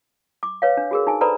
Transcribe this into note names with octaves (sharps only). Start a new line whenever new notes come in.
D6
B4 C#5 F5
D4
F#4 G#4 A#4
D#4 G#5
A4 B4 C5 D5 A#5 B5